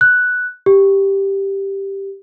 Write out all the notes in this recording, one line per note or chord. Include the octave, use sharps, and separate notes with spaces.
F#6
G4